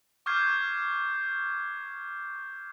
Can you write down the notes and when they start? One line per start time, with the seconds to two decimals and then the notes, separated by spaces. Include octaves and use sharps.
0.26 C#6 D6 F6 G6 G#6 C7